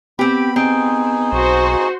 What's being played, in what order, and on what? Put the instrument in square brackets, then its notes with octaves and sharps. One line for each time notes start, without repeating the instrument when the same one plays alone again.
[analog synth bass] B3 [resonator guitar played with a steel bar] C4 G4 [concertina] B5
[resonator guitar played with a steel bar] C4 [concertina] D#4 G#4
[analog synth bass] B1 [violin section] F#4 C5